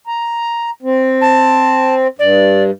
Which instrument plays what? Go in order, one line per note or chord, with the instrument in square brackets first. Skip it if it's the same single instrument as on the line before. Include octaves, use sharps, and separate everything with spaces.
[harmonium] A#5
C4
[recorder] A5
[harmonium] G2 [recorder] D5